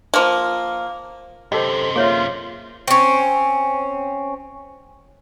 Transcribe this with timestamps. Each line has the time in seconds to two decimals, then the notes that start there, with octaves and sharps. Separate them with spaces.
0.14 F3 A#3
1.52 F#2 C3 G4 A4 C5 D#5
1.96 A#3 F4 G#4 C#5 E5
2.88 C4 C#4